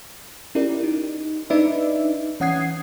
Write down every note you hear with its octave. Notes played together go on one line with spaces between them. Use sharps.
C#4 E4 G4 A#4 D5
D#4
D4 D#4 B4 D5 E5
E3 C#4 F#5 D#6 G#6 C7